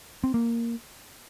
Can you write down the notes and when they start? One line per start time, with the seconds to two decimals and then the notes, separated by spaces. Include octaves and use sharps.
0.24 C4
0.34 A#3